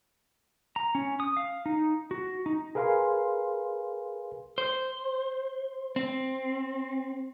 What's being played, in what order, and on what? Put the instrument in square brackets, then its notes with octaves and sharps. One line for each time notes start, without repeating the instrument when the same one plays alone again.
[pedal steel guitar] A#5
C#4
D#6
F5
D#4
F#4
D#4
[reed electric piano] G#4 A#4 B4 F5 G#5 C6
[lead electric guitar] C5
C4